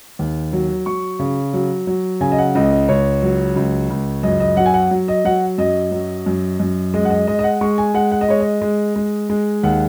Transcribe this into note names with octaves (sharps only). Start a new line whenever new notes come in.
D#2
F#3
F#3 C#6
C#3
F#3
F#3
C#3 G#5
D#5
F#5
C#2 D#5
D#5
C#2 C#5
F#3
C#2
C#2
F#2 D#5
D#5
F#3 F#5
G#5
F#5
F#3
D#5
F#3 F#5
F#2 D#5
F#3
F#2
F#2
G#3 D#5
F#5
D#5
G#3 D#5
D#5
F#5
G#3 C#6
G#5
G#3 F#5
F#5
D#5
G#3 C#5
D#5
G#3
G#3
G#3
D#2 F#5